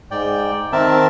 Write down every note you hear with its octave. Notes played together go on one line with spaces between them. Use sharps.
G#2 D5 G5
D#3 C4 A#4 E5 A5